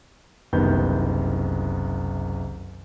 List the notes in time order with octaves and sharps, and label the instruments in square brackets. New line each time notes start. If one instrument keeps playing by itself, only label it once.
[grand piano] F#1 C2 D#3 B3 G6